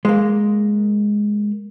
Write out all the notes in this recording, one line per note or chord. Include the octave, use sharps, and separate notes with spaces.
G#3 A#3